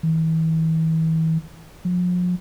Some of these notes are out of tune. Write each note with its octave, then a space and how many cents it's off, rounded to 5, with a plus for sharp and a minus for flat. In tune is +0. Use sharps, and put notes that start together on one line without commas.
E3 -40
F3 +40